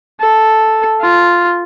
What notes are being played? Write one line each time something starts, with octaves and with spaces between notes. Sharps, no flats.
A4
F4